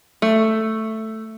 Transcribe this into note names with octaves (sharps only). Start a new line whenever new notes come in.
A3